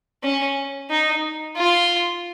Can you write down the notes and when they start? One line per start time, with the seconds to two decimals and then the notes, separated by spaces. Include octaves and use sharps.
0.23 C#4
0.90 D#4
1.57 F4